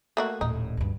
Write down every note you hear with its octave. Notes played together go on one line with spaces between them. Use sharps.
A3 A#3 F#4
D#1 A2 D#4
D2 G2